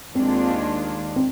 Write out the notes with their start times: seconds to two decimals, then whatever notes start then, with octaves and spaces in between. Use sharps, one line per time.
0.15 D#2 D#3 G#3 C4 D4 F4
1.16 C4